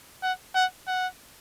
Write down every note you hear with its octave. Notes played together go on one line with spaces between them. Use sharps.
F#5
F#5
F#5